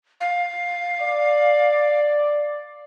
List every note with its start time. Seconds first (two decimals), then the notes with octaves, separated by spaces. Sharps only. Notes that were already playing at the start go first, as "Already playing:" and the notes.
0.21 F5
0.99 D5